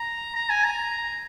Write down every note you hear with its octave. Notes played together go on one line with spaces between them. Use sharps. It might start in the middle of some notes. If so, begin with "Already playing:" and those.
Already playing: A#5
A#5
G#5
A#5